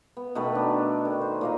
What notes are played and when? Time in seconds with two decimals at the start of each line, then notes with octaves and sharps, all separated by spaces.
0.17 B3
0.35 B2 D#3 A3 B5
0.55 D4
1.05 D#3
1.21 C5
1.41 A#2 A#3 D#5